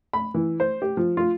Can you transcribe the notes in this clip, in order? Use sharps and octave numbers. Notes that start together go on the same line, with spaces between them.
B5
E3
C5
G4
F3
F4